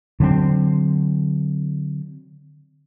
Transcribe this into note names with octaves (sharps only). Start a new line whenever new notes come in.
D3 F#3 A#3 C4